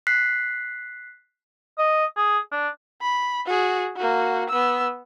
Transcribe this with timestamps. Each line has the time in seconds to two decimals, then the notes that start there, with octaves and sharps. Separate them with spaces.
0.07 F#6 B6 C7
1.78 D#5
2.16 G#4
2.51 D4
3.02 B5
3.46 F#4 G#4
3.97 A#3 F#4
4.50 B3 E6